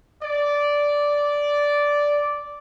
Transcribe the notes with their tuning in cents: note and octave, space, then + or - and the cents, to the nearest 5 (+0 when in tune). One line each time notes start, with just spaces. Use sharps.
D5 -10